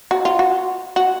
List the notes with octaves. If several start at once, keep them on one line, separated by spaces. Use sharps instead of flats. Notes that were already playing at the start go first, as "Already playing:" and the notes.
F#4
F4
F#4
F#4